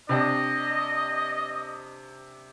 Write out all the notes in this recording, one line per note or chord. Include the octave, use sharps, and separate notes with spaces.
C3 D4 D#5 G5